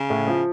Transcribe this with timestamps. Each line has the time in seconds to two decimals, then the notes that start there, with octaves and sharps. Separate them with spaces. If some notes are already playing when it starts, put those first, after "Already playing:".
Already playing: C#3
0.10 A2
0.27 F3